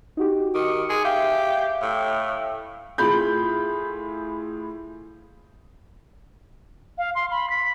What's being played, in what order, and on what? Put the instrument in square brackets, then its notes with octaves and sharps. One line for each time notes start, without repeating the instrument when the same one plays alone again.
[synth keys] D#4 F#4 G4
[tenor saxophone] D#3 [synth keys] D6 C#7
[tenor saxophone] G#4
[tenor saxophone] G4 [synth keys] E5 F5 G5
[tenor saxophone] A2
[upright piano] A2 F4 G#4 B5 G6
[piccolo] F5
C6
B5
B6